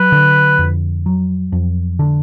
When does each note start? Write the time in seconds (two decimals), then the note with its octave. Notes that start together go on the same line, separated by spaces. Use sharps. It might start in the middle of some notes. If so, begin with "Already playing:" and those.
Already playing: F#3 B4
0.12 D3
0.59 F2
1.06 F#3
1.52 F2
1.99 D3